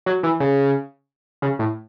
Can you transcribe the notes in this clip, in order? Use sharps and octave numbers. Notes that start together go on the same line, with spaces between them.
F#3
E3
C#3
C#3
A2